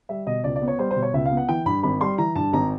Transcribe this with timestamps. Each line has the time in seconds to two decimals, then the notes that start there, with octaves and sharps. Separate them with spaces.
0.09 G3 E5
0.27 B2 D#5
0.44 C#2 D5
0.56 D5
0.61 B3
0.68 C#5
0.79 G3 C5
0.91 C5
0.96 B2
1.02 C#5
1.13 C#2 E5
1.25 F5
1.31 B3
1.37 F#5
1.49 E3 G5
1.66 G2 B5
1.83 G#1 B5
2.01 G3 C6
2.18 E3 A#5
2.35 G2 A5
2.53 G#1 A#5